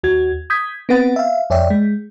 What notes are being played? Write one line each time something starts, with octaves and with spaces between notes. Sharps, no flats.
D#2 F#4 G#6
D#6 G6 G#6 B6
B3 C4 B4 F#5 A6
E5 F5
F2 C#5 D5 E5 G5
G#3